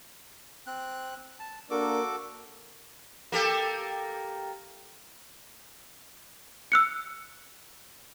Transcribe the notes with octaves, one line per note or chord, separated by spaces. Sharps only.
C4 F#6
A5
A#3 D4 F#4 A4 A#4 D6
A#3 G4 A4
E6 F#6 C#7